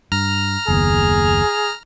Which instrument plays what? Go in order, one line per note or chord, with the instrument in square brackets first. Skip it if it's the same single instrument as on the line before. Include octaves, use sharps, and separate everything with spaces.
[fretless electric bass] G2 [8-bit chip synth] A#5 F6
[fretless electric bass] F#1 D#2 B3 [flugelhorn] G#4